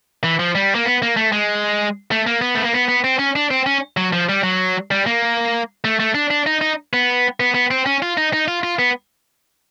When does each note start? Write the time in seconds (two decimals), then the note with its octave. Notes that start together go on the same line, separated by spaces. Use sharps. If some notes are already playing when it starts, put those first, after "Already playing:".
0.24 E3
0.39 F3
0.55 G3
0.75 A#3
0.86 B3
1.02 A#3
1.17 A3
1.32 G#3
2.11 A3
2.26 A#3
2.41 B3
2.55 A3
2.64 A#3
2.73 B3
2.88 B3
3.04 C4
3.19 C#4
3.36 D4
3.50 C4
3.66 C#4
3.97 F#3
4.13 F3
4.29 G3
4.43 F#3
4.91 G3
5.06 A#3
5.84 A3
6.00 A3
6.15 D4
6.31 D4
6.46 D#4
6.61 D#4
6.93 B3
7.40 B3
7.54 B3
7.71 C4
7.86 C#4
8.02 F4
8.17 D#4
8.33 D#4
8.48 F4
8.63 F4
8.79 B3